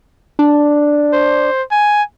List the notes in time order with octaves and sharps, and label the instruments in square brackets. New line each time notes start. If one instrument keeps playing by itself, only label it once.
[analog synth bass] D4
[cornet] C5
G#5